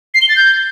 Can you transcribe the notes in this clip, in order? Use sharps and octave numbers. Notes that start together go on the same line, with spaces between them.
C7
G7
A6
G6